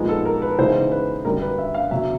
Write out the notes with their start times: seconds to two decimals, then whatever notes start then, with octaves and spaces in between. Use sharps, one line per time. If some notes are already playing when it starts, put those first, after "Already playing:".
Already playing: A#2 F3 G#3 B3 D#4
0.09 A4
0.25 A#4
0.42 B4
0.58 C#3 E3 G#3 B3 D#4 C5
0.92 B4
1.25 F#2 D3 G3 A#4
1.42 B4
1.59 E5
1.75 F5
1.91 E2 C#3 F#3 E5